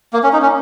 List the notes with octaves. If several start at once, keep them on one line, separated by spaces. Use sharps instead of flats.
A#3
C#4
D#4
C#4